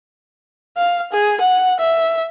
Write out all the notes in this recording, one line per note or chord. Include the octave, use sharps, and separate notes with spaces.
F5
G#4
F#5
E5